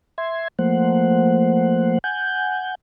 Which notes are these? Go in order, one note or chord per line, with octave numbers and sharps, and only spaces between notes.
E5 C6 G#6
F3 A3 A#3 C5 F#5
F#5 G#5 G6